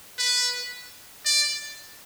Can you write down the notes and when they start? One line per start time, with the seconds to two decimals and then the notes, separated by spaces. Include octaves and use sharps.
0.18 B4
1.25 D5